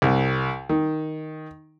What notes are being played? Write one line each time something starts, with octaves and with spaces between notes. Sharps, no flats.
C2
D#3